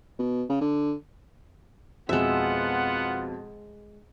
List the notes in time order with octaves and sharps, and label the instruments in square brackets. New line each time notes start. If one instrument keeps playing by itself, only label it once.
[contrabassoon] B2
C#3
D3
[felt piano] F2 B2 [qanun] G#3 E5 [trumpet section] B3 F4 F#5